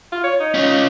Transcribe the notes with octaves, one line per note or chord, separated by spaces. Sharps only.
F4
C#5
D#4
C#4 F4